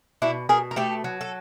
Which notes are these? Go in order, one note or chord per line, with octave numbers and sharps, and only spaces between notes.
B2 D4 E4
B2 G#4 A#4
A#4
A3 G4 A4
F#3
A4